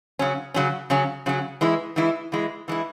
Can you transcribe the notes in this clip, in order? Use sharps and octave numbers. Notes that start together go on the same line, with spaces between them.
C#3 F#3 C#4
C#3 F#3 C#4
C#3 F#3 C#4
C#3 F#3 C#4
E3 G#3 E4
E3 G#3 E4
E3 G#3 E4
E3 G#3 E4